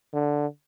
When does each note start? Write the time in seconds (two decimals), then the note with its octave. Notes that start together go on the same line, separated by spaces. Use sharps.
0.13 D3